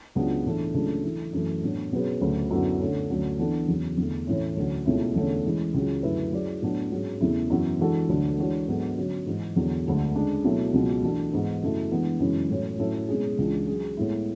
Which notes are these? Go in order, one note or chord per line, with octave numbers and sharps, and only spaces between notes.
C#2 C#3 F#3 B3 D4
A2 E3 A3 D4
C#2 C#3 F#3 A3 D4
E3 A3 E4
F#2 E3 A3
A2 F#3 B3 D4
B2 F#3 C#4 G#4 B4
D2 C#3 F#3
F#2 D3 F#3 B3 E4
D3 A3 C#4
D2 D3 F#3 C#4
E3 B3 D4 A4
E2 C#3 F#3
E2 D3 A3
A2 E3 A3 C#4 E4
D2 D3 F#3 C#4
C#2 B2 A3 C#4 E4
E2 D3 A3 C#4
E3 G#3 C#4
C#2 C#3 F#3
F#2 D3 A3 E4 B4
F#3 C#4 E4 G#4 D5
A2 F#3 B3 D4 F#4
G#2 F#3 C#4 G#4
E2 C#3 E3 A3 E4
F#2 E3 B3 F#4
E3 G#3 D4 F#4 A4
D2 D3 F#3 A3 D4
E3 G#3 D4 F#4 C#5
G#2 F#3 B3 D4 A4
D3 F#3 C#4 F#4
G#2 E3 G#3
E2 D3 F#3
D2 D3 G#3
C#3 G#3 D4 G#4
B2 F#3 A3 E4
C#2 B2 F#3 C#4
E3 A3 D4 F#4 A4
G#2 E3 B3
F#2 C#3 F#3 A3 E4
E3 G#3 B3 D4
F#2 C#3 E3 G#3 C#4
A2 F#3 C#4
A2 F#3 C#4 E4 A4
B2 G#3 C#4 G#4
C#2 C#3 E3 G#3 D4
F#3 C#4 G#4
A2 G#3 B3 E4